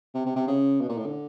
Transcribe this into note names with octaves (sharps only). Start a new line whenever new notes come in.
C3
C3
C3
C#3
B2
A#2
A2
D3